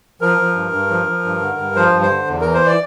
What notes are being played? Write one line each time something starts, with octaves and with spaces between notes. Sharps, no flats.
F3 A#4
F3
G2
G2
F3
F3
G2
D3
G2
F3 C5
G2
C5
D3
E2
E3 A#4
C5
D5